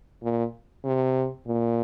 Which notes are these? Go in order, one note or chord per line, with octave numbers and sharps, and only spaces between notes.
A#2
C3
A#2